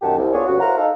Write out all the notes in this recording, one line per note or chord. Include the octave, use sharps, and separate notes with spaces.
F#2 A#2 D#3 G4 F#5 A5
C2
B3 D4 F4 G#4 C#5
D2 G2 B3 C#4 F#4
E4 C5 F5 F#5 A#5
D#4 A4 F5